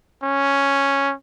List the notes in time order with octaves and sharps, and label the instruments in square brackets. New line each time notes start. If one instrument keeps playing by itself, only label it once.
[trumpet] C#4